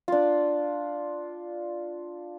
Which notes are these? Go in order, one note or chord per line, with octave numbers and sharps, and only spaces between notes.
D4 F4